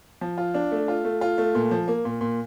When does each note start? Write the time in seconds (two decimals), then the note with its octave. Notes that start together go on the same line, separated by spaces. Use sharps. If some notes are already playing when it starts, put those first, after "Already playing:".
0.21 F3
0.38 F4
0.54 D4
0.72 A3
0.88 F4
1.05 A3
1.21 F4
1.38 A3
1.55 A#2
1.71 F3
1.88 A#3
2.05 A#2
2.21 A#2